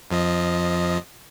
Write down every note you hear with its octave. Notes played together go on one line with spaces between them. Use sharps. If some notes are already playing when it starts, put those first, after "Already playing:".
F2 F3 D#5